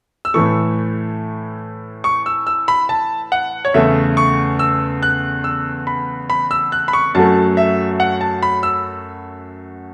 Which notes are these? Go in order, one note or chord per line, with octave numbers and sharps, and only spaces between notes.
E6
A2 E3 A3 C#6
C#6
E6
E6
B5
A5
F#5
C#5
E2 C#3 A3 E5
C#6
E6
F#6
E6
B5
B5
E6
F#6
B5
C#6
F#2 F#3 A3 A5
E5
F#5
A5
B5
E6